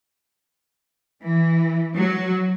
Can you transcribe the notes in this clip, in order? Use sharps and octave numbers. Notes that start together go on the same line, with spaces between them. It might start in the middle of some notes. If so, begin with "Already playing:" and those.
E3
F#3